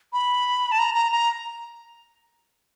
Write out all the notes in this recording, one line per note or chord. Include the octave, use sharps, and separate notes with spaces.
B5
A5
A#5
A#5
A#5